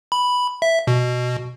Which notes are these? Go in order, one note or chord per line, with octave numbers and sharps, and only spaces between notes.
B5
E5
B2